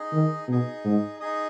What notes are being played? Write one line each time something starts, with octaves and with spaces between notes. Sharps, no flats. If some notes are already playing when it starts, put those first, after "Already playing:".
Already playing: D#4 G#4 D#5
D#3
B2 D#4 G#4 D#5
G#2
D#4 G#4 D#5